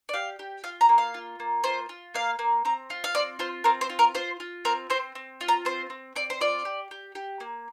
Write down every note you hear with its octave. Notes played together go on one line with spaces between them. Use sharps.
D5
G4 F5
G4
F4 F5
A#5
A#3
F5
F4
A#3
F4 C5
F4
A#3 F5
A#3
C4 A#5
F4
F5
C4 D5
F4 C5
C4 A#4
C5
F4
A#4
F4 C5
F4
C4 A#4
C4 C5
C4
F4
A#5
C4 C5
C4
C4 D5
C5
F4 D5
G4
G4
G4
A#3